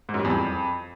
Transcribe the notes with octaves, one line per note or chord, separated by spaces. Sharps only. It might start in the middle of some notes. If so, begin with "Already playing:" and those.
G#2
F#2
G3
E2
F2